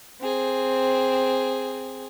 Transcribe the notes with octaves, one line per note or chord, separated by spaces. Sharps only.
C4 G#4